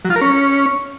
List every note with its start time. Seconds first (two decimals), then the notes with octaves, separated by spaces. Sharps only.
0.05 F#3
0.10 F4
0.16 A#4
0.21 C#4